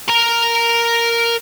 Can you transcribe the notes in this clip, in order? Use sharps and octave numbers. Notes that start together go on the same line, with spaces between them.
A#4 A#5